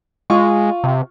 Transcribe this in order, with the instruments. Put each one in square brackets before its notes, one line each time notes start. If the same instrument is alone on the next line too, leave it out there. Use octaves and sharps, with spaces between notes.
[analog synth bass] G#3 [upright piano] F4 C#6
[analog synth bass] C3